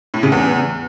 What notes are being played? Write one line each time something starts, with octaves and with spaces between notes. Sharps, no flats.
A2
C#3
E2